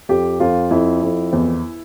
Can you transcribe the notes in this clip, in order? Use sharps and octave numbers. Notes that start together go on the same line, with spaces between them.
F2 G4
F2 F4
F2 E4
F2
E2